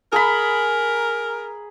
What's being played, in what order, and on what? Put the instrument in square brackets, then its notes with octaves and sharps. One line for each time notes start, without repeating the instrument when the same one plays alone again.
[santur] G#4 A#5 B5 [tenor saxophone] A#4